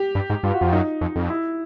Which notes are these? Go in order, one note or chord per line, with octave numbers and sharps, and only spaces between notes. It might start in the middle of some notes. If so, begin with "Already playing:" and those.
Already playing: G4
G2
G#2
G2 F4
F#4
F2 F4
F#2 D#4
F2
F2
E4